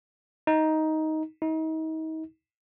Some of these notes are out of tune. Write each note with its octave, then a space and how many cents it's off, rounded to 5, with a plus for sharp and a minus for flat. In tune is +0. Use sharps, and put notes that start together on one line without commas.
D#4 +10
D#4 +35